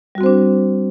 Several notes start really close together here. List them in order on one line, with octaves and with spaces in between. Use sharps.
G3 F#4 C4 C5 D4